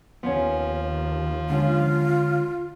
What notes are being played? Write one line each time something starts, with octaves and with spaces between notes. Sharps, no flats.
D#2 F3 B3 C#4
D3 G#3 C#4 F4